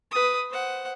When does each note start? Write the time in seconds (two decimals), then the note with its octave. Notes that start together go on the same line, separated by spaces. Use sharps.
0.11 B4 D#6
0.50 C5 F#5